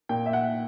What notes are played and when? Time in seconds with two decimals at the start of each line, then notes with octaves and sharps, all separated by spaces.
0.09 A#2 G5
0.26 E5
0.33 F#5